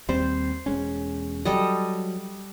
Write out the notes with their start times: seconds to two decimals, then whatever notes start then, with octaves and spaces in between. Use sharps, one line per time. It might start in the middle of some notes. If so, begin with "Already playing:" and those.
0.09 D#2 G3 C4 C5
0.66 E1 G#3 C#4
1.45 F#3 G3 A4 D#5